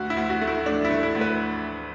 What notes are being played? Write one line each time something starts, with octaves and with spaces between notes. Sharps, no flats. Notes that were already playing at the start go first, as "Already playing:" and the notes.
Already playing: D2 F#4
E4
D2
F#4
A3
E4
A3 D4
E4
A3
E4
D2
B4